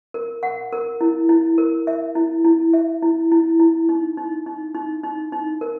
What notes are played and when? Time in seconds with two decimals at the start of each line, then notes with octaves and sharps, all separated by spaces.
0.14 A#4
0.43 F#5
0.73 A#4
1.01 E4
1.29 E4
1.58 A#4
1.87 E5
2.15 E4
2.45 E4
2.73 E5
3.02 E4
3.32 E4
3.60 E4
3.89 D#4
4.17 D#4
4.46 D#4
4.74 D#4
5.04 D#4
5.32 D#4
5.61 A#4